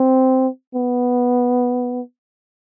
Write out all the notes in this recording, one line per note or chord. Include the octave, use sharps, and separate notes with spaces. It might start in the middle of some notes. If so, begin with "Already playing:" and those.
Already playing: C4
B3